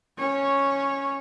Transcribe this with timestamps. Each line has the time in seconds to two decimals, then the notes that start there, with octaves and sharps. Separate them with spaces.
0.18 C#4 C#5